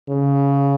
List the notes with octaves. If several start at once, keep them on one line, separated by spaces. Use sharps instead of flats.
C#3